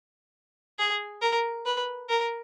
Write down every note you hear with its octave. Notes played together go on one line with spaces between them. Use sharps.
G#4
A#4
B4
A#4